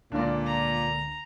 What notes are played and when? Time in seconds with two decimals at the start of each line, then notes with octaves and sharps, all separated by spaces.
0.12 C#2 A#2 D3 D4 F4 D5
0.46 A#5